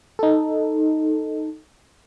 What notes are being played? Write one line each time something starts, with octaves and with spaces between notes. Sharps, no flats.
D#4 A4